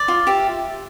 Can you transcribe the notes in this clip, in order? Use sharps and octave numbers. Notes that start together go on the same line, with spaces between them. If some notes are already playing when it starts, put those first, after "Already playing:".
Already playing: D5
F4
G4 E5